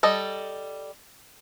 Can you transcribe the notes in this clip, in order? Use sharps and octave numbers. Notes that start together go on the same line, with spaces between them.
G3 A4 D#5